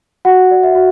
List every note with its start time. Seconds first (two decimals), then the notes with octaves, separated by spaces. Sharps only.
0.25 F#4 F#5
0.51 D5
0.63 E5
0.75 F#4